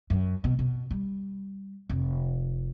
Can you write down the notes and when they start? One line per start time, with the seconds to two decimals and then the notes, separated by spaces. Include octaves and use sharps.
0.10 F#2
0.44 B2
0.59 B2
0.91 G3
1.89 F1